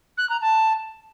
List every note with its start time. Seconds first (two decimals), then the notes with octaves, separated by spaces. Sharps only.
0.18 F#6
0.30 A#5
0.41 A5